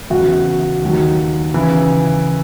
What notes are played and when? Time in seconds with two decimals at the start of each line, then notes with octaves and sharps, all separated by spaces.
0.10 E2 C#3 F#3 F#4
0.82 D#2 D#3 F#3
1.54 C#3 E3